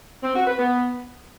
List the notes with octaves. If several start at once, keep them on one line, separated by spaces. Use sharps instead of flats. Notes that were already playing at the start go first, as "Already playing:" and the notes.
C4
F#4
B4
B3